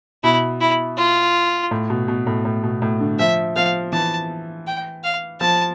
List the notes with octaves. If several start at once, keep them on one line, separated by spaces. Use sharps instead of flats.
B2 E4
E4
F4
A2
B2
B2
A2
A2
B2
A2
D3
F3 E5
F3 F5
E3 A5
G5
F5
F3 A5